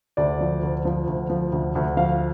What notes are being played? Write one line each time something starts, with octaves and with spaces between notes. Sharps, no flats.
D2 D5
F3
D2
F3
D2
F3
D2
D2
F3 F5